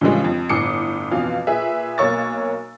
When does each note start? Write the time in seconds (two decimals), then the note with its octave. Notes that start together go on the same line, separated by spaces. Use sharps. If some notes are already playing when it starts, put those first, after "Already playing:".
0.01 A2 C#3 E3 F3 G3 G#3
0.24 F2
0.49 G1 A2 D6 D#6 C7 C#7
1.11 F2 B2 E3 F4 F5
1.47 A#2 G#4 B4 E5
1.98 B1 A#3 C#5 C#6 E6 A6